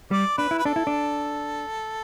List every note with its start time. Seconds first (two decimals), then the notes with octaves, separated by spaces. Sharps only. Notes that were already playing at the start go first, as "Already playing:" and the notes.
0.11 G3 D5
0.38 D4 B4
0.51 E4
0.59 B4
0.65 D4 A4
0.76 E4
0.87 D4